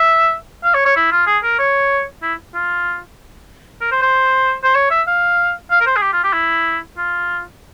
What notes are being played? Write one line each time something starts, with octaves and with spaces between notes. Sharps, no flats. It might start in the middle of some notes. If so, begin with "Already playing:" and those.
Already playing: E5
F5
C#5
C#5
E4
F4
G#4
A#4
C#5
E4
F4
A#4
C5
C5
C5
C#5
E5
F5
F5
A#4
C5
G#4
G4
F4
G4
E4
F4